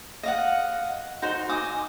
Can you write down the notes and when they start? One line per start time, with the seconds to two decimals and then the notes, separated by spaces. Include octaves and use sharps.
0.23 D#5 F5 F#5
1.22 D#4 F#4 C5
1.49 G#5 D6 D#6